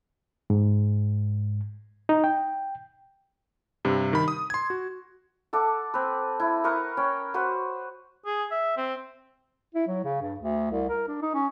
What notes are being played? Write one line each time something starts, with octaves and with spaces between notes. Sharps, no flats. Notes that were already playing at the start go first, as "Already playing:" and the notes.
G#2
D#4
G5
G2 C3
D#3 B5
D#6
C6 G#6
F#4
A4 F#5 D6
C4 B4
E4
A#4 B4 C#6 D#6
C#4 G5
F#4 B4 C5 F#5
G#4
E5
C4
E4
F#3
C#3
G2
D2
C2
A#4
D4
D#4
C#4